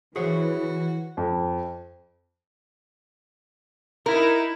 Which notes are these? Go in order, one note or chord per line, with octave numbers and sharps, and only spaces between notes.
E3 F#4 G#4 C5 C#5
F2
D#4 E4 A#4